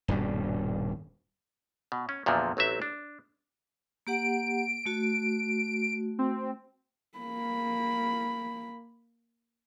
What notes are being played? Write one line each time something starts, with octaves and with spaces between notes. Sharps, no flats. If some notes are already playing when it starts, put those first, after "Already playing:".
D#1 G2 B2 G3
B2
C#4
E2 A#2 D3 F3 F#3
A1 F#3 C4 E5
D4
A#3 G4 F#5 D7
A3 F#4
C4
A#3 B5